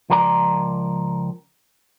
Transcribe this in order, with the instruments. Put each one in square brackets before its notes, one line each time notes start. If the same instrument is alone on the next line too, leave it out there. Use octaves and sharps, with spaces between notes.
[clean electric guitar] C#2 F3 A#4 D5 E5 A#5